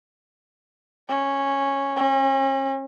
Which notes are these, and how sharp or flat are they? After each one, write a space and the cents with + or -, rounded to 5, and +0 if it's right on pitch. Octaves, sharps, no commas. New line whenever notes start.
C#4 -10
C#4 -40